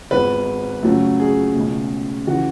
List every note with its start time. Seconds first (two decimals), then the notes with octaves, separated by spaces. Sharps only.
0.11 G#1 G#2 G#3 B3 B4
0.83 F#2 C#3 F#3 A3
1.20 G#4
1.55 C#2 B2 A3
2.27 C#3 E3 F#4